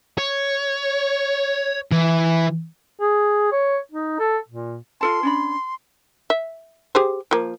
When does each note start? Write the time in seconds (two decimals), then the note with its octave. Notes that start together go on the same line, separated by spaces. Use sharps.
0.18 C#5
1.92 E3
3.00 G#4
3.52 C#5
3.92 D#4
4.19 A4
4.48 A#2
5.01 F4 A4 A5 C6
5.23 C#4 D4 B5
6.30 E5
6.95 G4 G#4 C5
7.31 F3 A#3